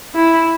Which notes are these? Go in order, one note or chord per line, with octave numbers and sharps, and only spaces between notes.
E4